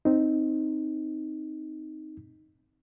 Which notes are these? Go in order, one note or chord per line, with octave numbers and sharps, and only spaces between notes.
C4 D#4